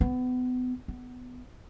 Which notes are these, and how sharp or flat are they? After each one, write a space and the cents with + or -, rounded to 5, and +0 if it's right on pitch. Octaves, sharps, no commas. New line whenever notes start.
B3 +30
B3 +15